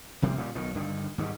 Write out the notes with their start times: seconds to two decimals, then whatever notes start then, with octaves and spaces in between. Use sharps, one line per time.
0.22 F1 C3 G3 A#3
0.37 A#2 C#3 E3 G3
0.55 B1 B2 D#3
0.75 G2 D3 D#3
1.18 G#2 D#3 F3 G3